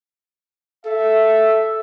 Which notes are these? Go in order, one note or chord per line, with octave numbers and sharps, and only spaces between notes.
A4 E5